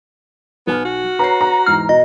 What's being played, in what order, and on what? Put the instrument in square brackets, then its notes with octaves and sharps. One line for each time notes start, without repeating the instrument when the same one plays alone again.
[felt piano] B1 G#5 F6 [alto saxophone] B3
[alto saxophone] F#4
[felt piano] B4 C#5 C7 [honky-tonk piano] A#5
[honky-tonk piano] A#5
[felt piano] E2 G#2 C7 [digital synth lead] F6
[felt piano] B2 [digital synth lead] D#5